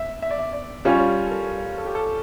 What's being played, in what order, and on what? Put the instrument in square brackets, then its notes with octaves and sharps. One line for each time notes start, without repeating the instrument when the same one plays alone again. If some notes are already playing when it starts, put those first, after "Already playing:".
Already playing: [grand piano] E5
E5
D5
E5
D5
[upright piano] G3 C#4 F4 [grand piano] C#5
[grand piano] A4
A#4
A4
G4
A4